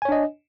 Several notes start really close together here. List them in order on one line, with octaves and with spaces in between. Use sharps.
G#5 C#5 D4 D#5